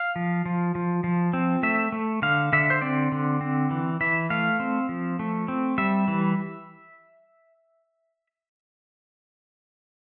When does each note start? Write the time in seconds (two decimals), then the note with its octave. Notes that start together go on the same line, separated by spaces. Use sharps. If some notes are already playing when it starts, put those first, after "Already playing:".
Already playing: F5
0.16 F3
0.46 F3
0.75 F3
1.04 F3
1.33 C4
1.63 A3 E5
1.92 A3
2.22 D3 F5
2.53 D3 E5
2.70 C5
2.82 C4 D5
3.12 D3
3.41 C4
3.71 E3
4.01 E3 E5
4.30 A3 F5
4.60 C4
4.89 F3
5.19 A3
5.48 C4
5.78 G3 E5
6.08 E3